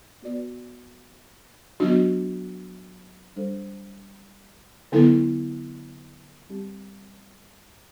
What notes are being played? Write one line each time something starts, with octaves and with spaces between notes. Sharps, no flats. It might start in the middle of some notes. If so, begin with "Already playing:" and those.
B3 F#4 B4 D5
F#3 B3 D4 F#4
G3 D4 A4 C5
D3 F#3 B3 E4 A4
G3 C4 G4